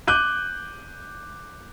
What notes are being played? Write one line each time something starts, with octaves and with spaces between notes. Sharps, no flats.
D6 F#6 G6 D#7